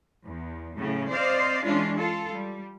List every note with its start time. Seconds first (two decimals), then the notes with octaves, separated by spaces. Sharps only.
0.25 E2
0.77 A2 C#3 F#3 C#4
1.10 C4 C5 D5 D#5 F5
1.64 E3 G#3 C#4 D4 F4
1.95 F4 A4
2.32 G3